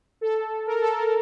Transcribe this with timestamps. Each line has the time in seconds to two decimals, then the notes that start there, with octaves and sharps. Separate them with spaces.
0.21 A4
0.66 A#4
0.82 A4
0.97 A#4